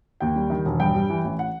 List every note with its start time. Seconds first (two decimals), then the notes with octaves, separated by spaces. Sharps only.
0.20 D#2 G5
0.36 G3
0.50 D#3
0.65 E1
0.80 G2 G5
0.95 G3
1.10 E3
1.25 A1
1.39 F#5